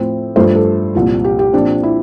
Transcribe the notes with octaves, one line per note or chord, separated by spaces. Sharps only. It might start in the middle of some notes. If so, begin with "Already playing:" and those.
Already playing: A2 F3 C4
G2 F3 A3 C5
A4
C2 A#2 F3
G4
G4
A#2 F3 C4 D4
E4